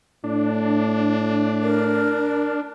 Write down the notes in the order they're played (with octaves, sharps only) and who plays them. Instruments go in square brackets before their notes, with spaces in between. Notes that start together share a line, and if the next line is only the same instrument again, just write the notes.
[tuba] A2 [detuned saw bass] D4
[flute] A#4